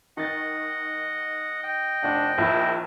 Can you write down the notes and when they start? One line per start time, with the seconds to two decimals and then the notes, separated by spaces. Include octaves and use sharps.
0.17 D#3 D#5 F#5 A6
1.63 D#5 G5
2.03 F1 D4 F#5
2.38 A#1 D#2 E4